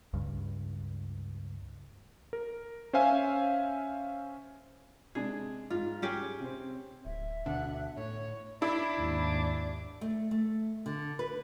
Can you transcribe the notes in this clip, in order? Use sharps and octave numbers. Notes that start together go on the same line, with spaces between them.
C#2 G2
A#4
C#4 C5 E5 F5 G#5
C3 G#3 D4 G#4
G#2 F4
C#4 G4 G#4
C3 C4
D1 E5
D2 B2 D3 D4 F#5
A2 C#5
D4 E4
D#2 G#2
A3
A3
D3
B4